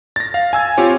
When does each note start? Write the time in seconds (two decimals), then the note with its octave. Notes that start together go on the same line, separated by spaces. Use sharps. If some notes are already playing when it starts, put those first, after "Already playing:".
0.16 A6 A#6
0.34 F5
0.53 G#5 E6 G#6
0.78 C4 F4 G4 C#5